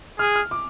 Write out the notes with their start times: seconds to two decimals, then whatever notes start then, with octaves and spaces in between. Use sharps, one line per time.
0.19 G#4 F6
0.36 F6
0.51 D6